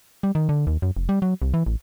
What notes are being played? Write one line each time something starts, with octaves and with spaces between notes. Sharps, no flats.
G3
D#3
D3
D#2
F#2
F1
G3
F#3
C2
E3
A1